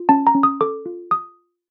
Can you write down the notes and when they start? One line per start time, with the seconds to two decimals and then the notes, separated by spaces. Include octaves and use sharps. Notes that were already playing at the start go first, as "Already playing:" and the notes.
Already playing: F4
0.09 C#4 A5
0.27 A#5
0.35 C#4
0.43 D#6
0.61 A4 D6
0.86 F4
1.11 D#6